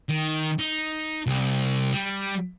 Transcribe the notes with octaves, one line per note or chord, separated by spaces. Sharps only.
D#3
D#4
C2
G3